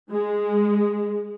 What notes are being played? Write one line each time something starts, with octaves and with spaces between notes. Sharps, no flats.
G#3